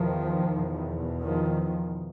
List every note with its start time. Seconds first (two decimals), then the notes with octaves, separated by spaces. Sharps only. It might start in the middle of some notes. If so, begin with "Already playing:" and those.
Already playing: E2 B2 D#3 F3
0.51 E2 B2
1.22 D#3 F3